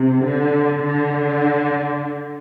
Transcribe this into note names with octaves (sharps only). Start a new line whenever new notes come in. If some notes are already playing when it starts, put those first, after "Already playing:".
Already playing: C3
D3
D3